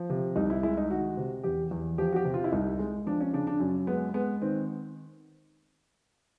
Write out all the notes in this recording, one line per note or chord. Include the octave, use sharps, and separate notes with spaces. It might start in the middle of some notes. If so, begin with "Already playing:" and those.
Already playing: F3
C3
C2 D#4
E4
G#3 E4
D#4
D#3 F#4
C3
E2 G4
E2
F3 G4
F#4
G4
C3
F4
E4
C2 D#4
G#3
F3 D4
C#4
C#3 D4
D4
F#2 C#4
G#3 B3
G#3 B3
D#3 C4